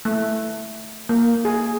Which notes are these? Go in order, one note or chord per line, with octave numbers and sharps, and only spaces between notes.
A3
A#3
G#4